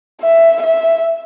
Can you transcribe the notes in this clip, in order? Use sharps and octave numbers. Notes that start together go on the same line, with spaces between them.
E5
E5